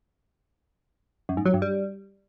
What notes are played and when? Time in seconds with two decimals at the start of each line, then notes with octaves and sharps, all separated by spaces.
1.29 F#2
1.37 G#2
1.45 F#3
1.54 G2
1.62 G3